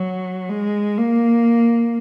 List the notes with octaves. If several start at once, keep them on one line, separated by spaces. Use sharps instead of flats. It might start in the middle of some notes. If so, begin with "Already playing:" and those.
Already playing: F#3
G#3
A#3